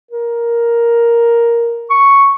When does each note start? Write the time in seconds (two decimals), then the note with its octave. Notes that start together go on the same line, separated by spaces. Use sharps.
0.11 A#4
1.90 C#6